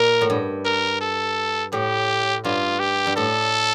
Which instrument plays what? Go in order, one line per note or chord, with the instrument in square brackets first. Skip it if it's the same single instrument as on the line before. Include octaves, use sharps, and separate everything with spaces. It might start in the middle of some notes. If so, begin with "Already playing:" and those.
Already playing: [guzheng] A#2 [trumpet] A#4
[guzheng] A2
G2
[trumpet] A#4
A4
[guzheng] A2 [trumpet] G4
[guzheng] G2 [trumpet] F4
[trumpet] G4
[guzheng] G2
[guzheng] A2 [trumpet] A4